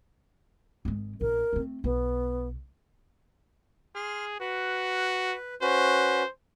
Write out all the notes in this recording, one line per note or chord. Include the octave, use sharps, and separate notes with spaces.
G#1 G#3
A#1 B3 A#4
A3 C4
B1 B3
G#4 C6 F6
F#4 B4
C#4 F#4 B4 C5